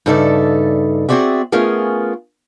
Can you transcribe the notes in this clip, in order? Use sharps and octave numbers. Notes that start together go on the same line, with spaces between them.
G2 C#3 D#4 A4 D5 E5
C4 F#4 G#4 D5 E5
A3 B3 C#4 F4 G#4 A#4